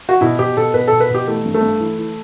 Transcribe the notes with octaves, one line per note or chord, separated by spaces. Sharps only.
F#4
B2 E4
B2 G4
B2 A4
B2 B4
B2 A4
B4
B2 G4
E3 A3
G2
A3
G2
E3
E3